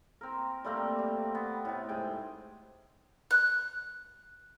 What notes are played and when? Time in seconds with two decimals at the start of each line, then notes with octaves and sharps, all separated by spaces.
0.21 C4 A#4
0.64 G3 A3 A#3 C4
0.99 G3
1.35 B3
1.65 A2 C3
1.89 G#2 C3 G#4 G5
3.31 F#6